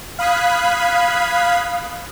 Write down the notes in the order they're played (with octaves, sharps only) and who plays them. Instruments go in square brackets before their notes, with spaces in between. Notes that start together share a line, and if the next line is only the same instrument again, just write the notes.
[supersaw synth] F5 B5 D#6 F#6 G#6 B6